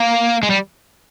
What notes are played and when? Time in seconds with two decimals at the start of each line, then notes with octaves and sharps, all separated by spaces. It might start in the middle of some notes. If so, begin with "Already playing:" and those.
Already playing: A#3
0.43 G#3
0.50 G3